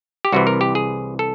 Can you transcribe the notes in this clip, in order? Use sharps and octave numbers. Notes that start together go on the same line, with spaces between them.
G4
C2 C3 E3 F#4
A#4
G4
G#4
A4